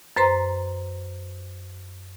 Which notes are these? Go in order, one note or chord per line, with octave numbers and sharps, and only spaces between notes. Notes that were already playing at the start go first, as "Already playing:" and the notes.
F#2 B4 C5 A#5 C6